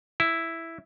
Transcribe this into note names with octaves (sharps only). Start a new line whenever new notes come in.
E4